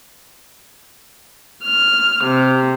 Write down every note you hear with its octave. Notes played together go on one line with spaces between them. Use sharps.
F6
C3